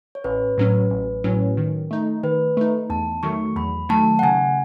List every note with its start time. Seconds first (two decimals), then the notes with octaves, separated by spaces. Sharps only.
0.15 C#5
0.24 A1 B4
0.58 A2 F#3 C#4
0.91 A1
1.24 A2 F#3 C#4
1.57 D#3
1.91 A3 D#4
2.23 D#3 B4
2.57 A3 D#4
2.90 E2 A5
3.23 D#3 F#3 A3 C#6
3.56 E2 B5
3.89 D#3 F#3 A3 A5
4.19 F#5
4.23 C#3 G#5